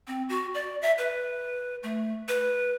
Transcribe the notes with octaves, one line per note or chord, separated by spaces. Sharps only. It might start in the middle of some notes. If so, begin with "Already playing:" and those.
C4
F#4
D5
E5
B4
A3
B4